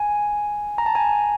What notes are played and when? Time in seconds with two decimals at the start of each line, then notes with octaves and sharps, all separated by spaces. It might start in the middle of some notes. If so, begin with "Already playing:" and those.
Already playing: G#5
0.78 A#5
0.86 A5
0.95 G#5 A#5